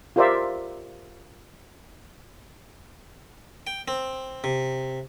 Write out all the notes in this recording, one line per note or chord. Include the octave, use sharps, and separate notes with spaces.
F4 G4 A#4 C5 D5 E5
G5
C4
C3